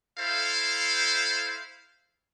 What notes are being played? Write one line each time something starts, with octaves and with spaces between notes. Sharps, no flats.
E4 A4 C5 F5